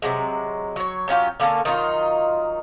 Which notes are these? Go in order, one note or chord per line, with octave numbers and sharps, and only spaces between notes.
C3 F#3 G#3
F#3 C#5
F#3 C#4 F4 G4
D3 A#3 C#4 A4
D#3 F#3 D#4 F4